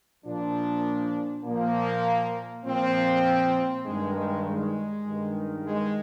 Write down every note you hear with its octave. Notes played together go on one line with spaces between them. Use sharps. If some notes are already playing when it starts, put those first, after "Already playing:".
A#2 F3 D4
A#2 F3 A#3
A#2 F3 C4
G2 D#3 G#3
G#3
G#3
G2 D#3
G#3